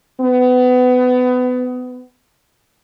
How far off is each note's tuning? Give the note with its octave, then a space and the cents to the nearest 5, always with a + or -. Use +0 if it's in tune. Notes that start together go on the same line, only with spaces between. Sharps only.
B3 +25